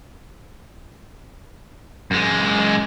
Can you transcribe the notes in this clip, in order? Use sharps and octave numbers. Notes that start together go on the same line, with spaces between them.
F#2 G#3